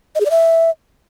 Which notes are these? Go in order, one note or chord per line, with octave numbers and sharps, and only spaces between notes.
D#5
G#4
D5
E5